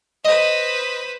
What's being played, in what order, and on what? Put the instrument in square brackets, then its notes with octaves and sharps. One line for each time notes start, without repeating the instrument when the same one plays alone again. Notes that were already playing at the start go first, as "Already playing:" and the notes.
[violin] B4 C5 [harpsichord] D#5